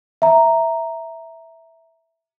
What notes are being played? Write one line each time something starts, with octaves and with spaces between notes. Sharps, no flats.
E5 A#5